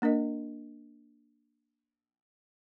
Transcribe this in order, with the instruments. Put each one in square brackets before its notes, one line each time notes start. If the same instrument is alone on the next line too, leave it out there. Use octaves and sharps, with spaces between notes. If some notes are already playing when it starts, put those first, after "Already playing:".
[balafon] A#3 D4 A#4 D#5